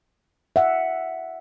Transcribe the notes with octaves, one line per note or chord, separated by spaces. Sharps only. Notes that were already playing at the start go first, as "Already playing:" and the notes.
E5 F#5